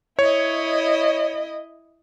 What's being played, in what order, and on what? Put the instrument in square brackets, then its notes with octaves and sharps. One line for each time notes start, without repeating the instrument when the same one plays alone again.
[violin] E4 D#5 [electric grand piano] C#5